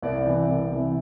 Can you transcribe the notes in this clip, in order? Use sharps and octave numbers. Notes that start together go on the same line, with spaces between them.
C2 D5
C3 E3
C2
C3 E3